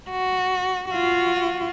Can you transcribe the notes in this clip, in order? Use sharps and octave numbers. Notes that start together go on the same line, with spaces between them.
F#4
F4 F#4